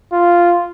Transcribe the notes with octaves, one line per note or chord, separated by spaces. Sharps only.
F4